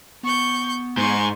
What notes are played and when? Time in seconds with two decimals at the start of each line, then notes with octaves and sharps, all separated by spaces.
0.23 B3 C#6 G6
0.97 G#2 C6 C#6